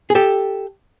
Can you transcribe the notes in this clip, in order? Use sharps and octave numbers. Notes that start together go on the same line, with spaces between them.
G#4
G4 A4